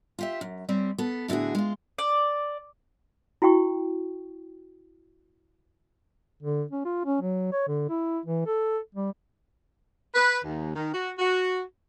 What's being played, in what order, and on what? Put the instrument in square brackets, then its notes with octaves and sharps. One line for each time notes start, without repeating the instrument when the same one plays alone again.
[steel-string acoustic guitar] F4 G4 E5
F#2
G3 C4 C#4
B3 A4
A2 D3 E4 F#4 G#4
G#3 F4
[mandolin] D5
[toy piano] E4 F#4 G5 C#6
[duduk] D3
C#4
F4
C#4
F#3
C#5
D3
E4
E3
A4
G3
[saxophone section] B4
D#2
D#3
F#4
F#4